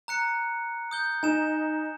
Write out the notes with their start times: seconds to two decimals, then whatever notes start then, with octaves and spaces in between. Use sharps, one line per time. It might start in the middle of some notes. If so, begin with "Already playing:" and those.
0.08 A#5 F#6 C#7
0.91 D#6 G6 G7
1.23 D#4 G#5 E7